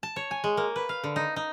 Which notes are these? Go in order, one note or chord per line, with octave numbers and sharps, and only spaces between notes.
A5
C#5
G#5
G#3
A#3
B4
F5
D3
D#4
D#4